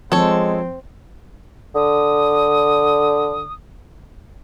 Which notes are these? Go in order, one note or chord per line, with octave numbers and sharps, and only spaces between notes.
F3 G#3 C4 A4 C#5
D3 D#6